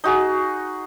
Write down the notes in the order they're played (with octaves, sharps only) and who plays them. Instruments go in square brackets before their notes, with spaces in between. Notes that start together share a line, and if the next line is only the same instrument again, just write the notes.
[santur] D#4 F#4 G#4